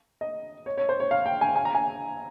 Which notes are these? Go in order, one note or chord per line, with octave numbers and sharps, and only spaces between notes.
D#5
C#5
C#5
C5
C#5
F5
G5
G#5
G#5
A#5
G#5